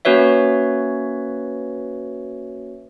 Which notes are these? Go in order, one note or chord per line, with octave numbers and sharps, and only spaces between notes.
A#3 C#4 F#4 B4 C#5 E5